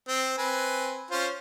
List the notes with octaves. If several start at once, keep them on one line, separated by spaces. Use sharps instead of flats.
C4
C4 B4 G#5
C#4 F4 C5